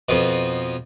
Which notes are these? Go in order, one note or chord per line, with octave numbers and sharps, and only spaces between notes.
F2 B2